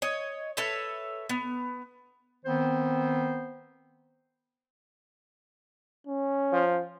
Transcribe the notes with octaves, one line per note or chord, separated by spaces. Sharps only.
C#5 D#5
A4 B4 C#5 E5
B3
D#3 B3 C4 C5
C#4
F3